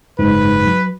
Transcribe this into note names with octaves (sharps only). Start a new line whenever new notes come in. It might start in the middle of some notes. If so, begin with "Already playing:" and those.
F#1 G#2 B4
F#3